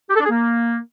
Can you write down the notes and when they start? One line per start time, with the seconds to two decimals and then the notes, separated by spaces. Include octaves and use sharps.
0.09 G4
0.15 A4
0.20 D4
0.25 G#4
0.30 A#3